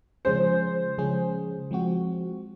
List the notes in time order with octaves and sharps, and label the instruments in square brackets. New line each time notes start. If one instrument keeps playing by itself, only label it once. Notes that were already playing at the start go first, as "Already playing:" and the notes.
[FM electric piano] C#3 F3 G#3 C#4 G#4 [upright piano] C5
[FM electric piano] C#3 F3 G#3 C#4 G#4
F3 G#3 C4 F#4